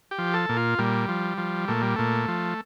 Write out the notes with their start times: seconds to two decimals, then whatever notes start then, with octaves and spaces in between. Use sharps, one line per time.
0.11 G4
0.18 F3
0.33 A4
0.49 A#2
0.57 F4
0.78 A#2 G3
1.08 F3
1.38 F3
1.68 A#2 A3
1.82 G3
1.96 A#2 A3
2.28 F3